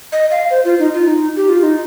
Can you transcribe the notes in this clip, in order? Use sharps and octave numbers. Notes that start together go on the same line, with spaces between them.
D#5
F5
C5
F4
D#4
F4
D#4
G4
F4
D#4